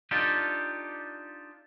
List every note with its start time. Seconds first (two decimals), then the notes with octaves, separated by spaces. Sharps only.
0.11 D4 D#4 F4 G4 A4